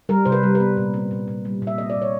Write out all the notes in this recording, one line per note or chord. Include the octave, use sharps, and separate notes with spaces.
G3 A#4
C3 C5
B4
G3
B4
B3
A#2
C4
A#2
A#2
G3
A#2
E5
C4 D#5
D5
A#2
C#5